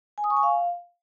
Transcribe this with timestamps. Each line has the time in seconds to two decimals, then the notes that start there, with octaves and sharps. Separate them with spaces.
0.18 G#5
0.24 D#6
0.30 C#6
0.37 G#5
0.43 F5